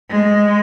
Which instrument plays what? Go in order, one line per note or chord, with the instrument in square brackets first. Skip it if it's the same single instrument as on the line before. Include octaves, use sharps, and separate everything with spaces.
[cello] G#3